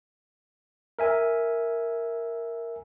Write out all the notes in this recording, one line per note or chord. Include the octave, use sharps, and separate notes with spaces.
A#4 E5 G#5